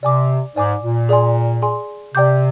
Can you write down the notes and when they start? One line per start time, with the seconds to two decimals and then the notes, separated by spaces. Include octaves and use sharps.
0.03 C3 D5 G#5 D6
0.56 G#2 D5 G#5 D6
0.82 A#2
1.09 G#4 D5 G#5 C6
1.62 G#4 D5 G#5 C6
2.14 C3 D5 G5 D6 G6